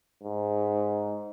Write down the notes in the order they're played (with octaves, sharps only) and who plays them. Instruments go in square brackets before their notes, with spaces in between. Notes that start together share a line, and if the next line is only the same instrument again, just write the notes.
[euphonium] G#2